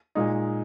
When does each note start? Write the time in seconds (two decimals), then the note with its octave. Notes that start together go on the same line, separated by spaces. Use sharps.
0.15 A#2 G#3 D#4